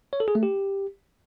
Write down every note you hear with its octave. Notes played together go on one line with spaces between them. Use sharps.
C#5
A4
G#4
A3
G4